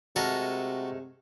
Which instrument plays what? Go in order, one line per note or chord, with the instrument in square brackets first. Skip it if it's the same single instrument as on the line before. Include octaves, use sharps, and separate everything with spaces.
[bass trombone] C3 [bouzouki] G#3 A3 A#4 [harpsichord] F#4 A4